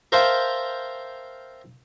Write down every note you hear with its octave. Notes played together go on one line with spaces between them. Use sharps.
A#4 C5 E5 F5 G5 A5